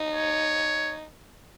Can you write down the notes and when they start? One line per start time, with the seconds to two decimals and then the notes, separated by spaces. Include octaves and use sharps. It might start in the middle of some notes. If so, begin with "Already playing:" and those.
Already playing: D#4
0.14 C#5